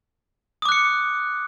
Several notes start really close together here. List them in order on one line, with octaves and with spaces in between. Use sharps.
D#6 D6 F#6 C#7